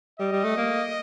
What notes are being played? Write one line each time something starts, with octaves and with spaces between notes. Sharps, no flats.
G3 D#5
G3
A3
A#3